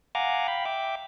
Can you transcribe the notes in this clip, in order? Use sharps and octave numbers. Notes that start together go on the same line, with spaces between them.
F5 F#5 G#5 A#5 D6
F5 G5 B5
E5 G5 D6